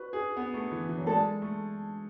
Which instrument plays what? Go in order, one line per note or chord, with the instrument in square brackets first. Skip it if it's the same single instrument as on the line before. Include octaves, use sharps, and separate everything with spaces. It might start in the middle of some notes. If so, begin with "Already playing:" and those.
Already playing: [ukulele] F#4 [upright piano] B4
[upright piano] G#4
B3
A3
E3
E3
F#3
[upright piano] G#3 [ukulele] A4 D5 A5
[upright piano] A3